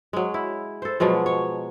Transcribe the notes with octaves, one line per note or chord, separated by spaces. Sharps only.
F#3 G#3
E4
A4 C5
B2 F3 F#3 G#3
C#5